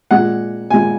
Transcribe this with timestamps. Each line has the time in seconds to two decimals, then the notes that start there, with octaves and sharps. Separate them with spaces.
0.11 A#2 G#3 F#5
0.70 A#2 G#3 G#5